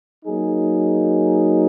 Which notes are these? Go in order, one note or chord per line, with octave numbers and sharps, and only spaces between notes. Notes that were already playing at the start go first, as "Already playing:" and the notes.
F#3 A#3 D#4 G#4